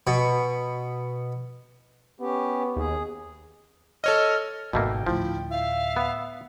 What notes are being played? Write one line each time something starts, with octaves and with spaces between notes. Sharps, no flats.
B2
B3 C#4 G4
D#2 G#4
A4 C#5 D#5 F6
G#1 B2 D#3 A3 A#3 G5
D2 A2 F3 E4
E5 F5
B3